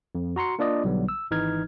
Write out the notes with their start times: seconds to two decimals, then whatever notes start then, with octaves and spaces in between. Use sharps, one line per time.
0.15 F2
0.36 F#4 A#5 C6 C#7
0.59 A#3 D4 F4 D5 D#5
0.84 B1 D3 F#3 G3 B3
1.09 E6
1.31 G#1 E3 D#4 F6 G#6